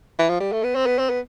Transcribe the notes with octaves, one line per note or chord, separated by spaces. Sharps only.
E3
F3
G3
A3
B3
C4
B3
C4
B3